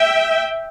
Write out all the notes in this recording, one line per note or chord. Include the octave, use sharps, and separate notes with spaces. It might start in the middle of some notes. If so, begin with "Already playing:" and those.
Already playing: E5 G5